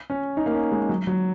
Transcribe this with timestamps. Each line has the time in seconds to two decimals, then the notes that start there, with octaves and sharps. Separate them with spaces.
0.10 C#4
0.37 D#4
0.46 A#3
0.54 C#4
0.72 G#3
0.89 F#3
1.07 F#3